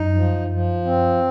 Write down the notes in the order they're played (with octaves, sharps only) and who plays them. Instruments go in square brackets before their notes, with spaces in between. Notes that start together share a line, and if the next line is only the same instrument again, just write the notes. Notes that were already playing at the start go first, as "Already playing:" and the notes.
Already playing: [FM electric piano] F#2 [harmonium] D#4
[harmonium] F3
F3
C4